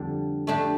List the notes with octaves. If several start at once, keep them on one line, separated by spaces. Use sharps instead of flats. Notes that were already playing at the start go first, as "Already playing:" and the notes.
Already playing: F2 D3 G3 D4
A3 D4 G4